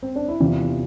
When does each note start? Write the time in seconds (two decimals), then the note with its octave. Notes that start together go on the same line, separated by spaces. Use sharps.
0.03 C4
0.16 D4
0.28 E4
0.40 E2 C3 E3 F4